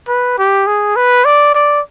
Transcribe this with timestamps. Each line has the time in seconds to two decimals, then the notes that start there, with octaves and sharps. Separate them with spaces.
0.08 B4
0.38 G4
0.67 G#4
0.96 B4
1.25 D5
1.54 D5